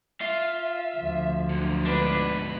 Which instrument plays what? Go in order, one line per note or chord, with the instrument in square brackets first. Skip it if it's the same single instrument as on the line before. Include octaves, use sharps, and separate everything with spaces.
[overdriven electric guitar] F4 F5 [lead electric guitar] E5
[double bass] D2 F3
[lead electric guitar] D3 F#3
[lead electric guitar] G#2 B2 [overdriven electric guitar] D4 [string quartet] B4